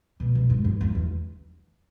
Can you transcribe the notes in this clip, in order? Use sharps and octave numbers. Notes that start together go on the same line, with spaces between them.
B2
B2
G#2
G2
E2
E2